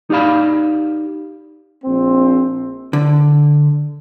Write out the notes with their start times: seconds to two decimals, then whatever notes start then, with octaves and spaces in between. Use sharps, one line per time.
0.10 D#4 G4 D5 F5 B5
1.84 A#1 C4
2.93 D3